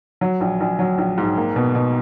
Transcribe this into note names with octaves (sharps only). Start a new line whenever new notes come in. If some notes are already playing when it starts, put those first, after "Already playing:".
F#3
A#1
A#1
F#3
A#1
G#2
A#3
B2
B2